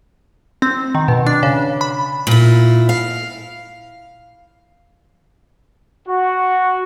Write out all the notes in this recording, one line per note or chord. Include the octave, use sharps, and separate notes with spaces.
C4
D#3
B2
D4
C#3
B5
A#2 E4
F5
F#4